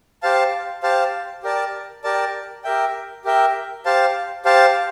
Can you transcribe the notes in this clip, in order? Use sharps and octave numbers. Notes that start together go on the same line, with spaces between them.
G4 C5 F5 A5
G4 C5 F5 A5
G4 A#4 D5 A5
G4 A#4 D5 A5
G4 A#4 E5 G5
G4 A#4 E5 G5
G4 C5 F5 A5
G4 C5 F5 A5